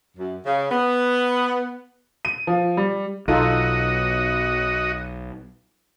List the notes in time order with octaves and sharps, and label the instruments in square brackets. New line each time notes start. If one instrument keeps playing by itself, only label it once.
[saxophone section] F#2
C#3
B3
[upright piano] D#7
F3
G3
[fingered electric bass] B1 [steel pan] D#4 F4 A4 [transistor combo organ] F#4 D#5